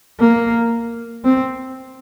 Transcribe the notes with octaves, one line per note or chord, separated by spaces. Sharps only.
A#3
C4